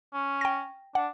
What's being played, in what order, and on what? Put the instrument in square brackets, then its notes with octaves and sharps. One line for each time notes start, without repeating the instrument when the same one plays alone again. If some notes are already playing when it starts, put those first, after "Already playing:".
[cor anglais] C#4
[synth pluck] G5 A#6
[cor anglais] D4 [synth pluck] F#5